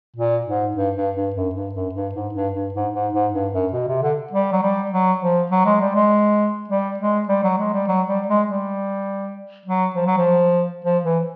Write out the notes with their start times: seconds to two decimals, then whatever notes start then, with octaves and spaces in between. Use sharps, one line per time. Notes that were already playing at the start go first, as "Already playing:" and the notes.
0.16 A#2
0.47 G#2
0.77 G2
0.96 G2
1.16 G2
1.36 F#2
1.55 G2
1.75 F#2
1.95 G2
2.15 G#2
2.34 G2
2.54 G2
2.74 G#2
2.94 G#2
3.13 G#2
3.34 G2
3.53 F#2
3.73 B2
3.88 C3
4.02 D3
4.32 G3
4.52 F#3
4.62 G3
4.91 F#3
5.20 F3
5.51 F#3
5.66 G#3
5.81 G3
5.95 G#3
6.69 G3
6.99 G#3
7.29 G3
7.43 F#3
7.58 G#3
7.73 G3
7.88 F#3
8.08 G3
8.28 G#3
8.47 G3
9.66 F#3
9.96 F3
10.06 F#3
10.18 F3
10.85 F3
11.04 E3